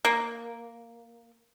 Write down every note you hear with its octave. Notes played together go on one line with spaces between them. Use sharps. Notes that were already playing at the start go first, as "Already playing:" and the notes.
A#3